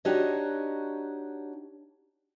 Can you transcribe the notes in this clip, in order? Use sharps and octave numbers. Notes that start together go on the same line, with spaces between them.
D4 D#4 F#4 G4 C#5 D#5